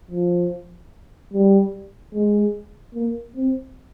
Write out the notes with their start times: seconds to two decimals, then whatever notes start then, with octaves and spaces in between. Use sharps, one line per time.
0.11 F3
1.34 G3
2.15 G#3
2.95 A#3
3.36 C4